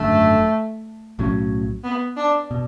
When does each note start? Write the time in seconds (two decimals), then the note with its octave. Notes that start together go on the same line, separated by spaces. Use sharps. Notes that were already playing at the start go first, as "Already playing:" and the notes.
Already playing: G#1 F#2 D3 A3
1.19 B1 A2 F#3 C#4
1.84 B3
2.17 D4
2.51 B2